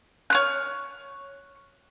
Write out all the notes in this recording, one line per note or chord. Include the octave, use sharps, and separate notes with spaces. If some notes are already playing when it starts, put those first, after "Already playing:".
C#5 F6 F#6